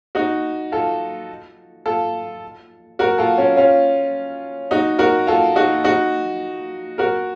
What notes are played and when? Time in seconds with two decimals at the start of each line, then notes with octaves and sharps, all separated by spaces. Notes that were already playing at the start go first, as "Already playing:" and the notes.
0.15 D#4 F#4
0.72 F4 A4
1.86 F4 A4
2.99 F#4 A#4
3.18 F4 A4
3.38 C#4 F4
3.56 C#4 F4
4.71 D#4 F#4
4.99 F#4 A#4
5.27 F4 A4
5.56 D#4 F#4
5.84 D#4 F#4
6.98 F#4 A#4